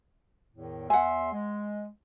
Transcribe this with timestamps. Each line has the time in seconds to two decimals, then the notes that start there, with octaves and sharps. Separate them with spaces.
0.55 E2 A2 D#3
0.90 E2 E5 F#5 G#5 C6
1.33 G#3